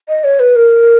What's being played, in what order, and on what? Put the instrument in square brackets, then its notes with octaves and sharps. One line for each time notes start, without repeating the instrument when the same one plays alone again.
[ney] D#5
C#5
B4
A#4